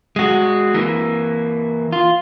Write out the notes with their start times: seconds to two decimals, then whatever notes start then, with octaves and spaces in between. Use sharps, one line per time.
0.16 G#3 F#4
0.74 E3 A#3
1.93 F4